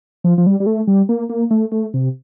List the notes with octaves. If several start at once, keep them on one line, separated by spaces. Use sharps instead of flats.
F3
F3
G3
G3
A3
G3
A#3
A#3
A3
A3
C3